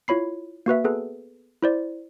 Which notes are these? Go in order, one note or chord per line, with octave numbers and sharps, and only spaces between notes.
E4 F4 C#5 B5 C7
A#3 F#4 B4 E5
B3 G#4 A4 B4
E4 C5 D5